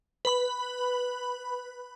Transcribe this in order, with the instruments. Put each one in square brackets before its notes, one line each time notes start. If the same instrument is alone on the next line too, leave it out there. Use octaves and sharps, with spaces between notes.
[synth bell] B4 B5